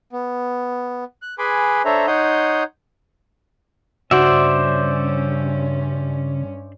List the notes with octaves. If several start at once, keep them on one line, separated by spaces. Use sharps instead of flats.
B3
F#6
G#4 B4 G#5 B5 C6 D6
D4 A4 C5 C#5 E5 A#5
D#4 C#5 F#5 C6 D#6 G6
G2 C#3 C#4 F#4 C5 D5 E5